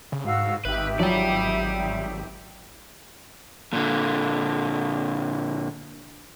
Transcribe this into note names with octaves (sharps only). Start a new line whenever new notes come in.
C#3
G#2 F#4 F5 E6
G#1 D#4 G4 B4 E5
F3 F#3 F#4 D5 G5
A#2 D3